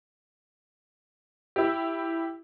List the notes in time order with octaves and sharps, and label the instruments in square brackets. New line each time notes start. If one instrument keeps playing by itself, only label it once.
[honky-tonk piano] E4 G4